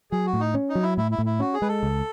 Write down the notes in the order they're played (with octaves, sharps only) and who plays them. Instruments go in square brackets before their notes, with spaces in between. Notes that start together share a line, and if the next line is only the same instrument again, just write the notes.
[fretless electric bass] F#3 [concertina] G#4
[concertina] F#4
[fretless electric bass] A2
[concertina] D#4
[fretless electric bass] C#4
[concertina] D#4
[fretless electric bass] F#3
[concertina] E4
[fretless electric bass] A2 [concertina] E4
[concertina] E4
[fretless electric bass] A2
[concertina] E4
[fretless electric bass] C#4 [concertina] F#4
[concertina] G#4
[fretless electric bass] G#3 [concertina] B4
[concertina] A4
[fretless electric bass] C#2